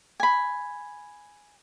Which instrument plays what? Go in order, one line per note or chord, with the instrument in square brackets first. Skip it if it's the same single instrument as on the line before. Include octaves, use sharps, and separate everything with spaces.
[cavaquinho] G#5 B5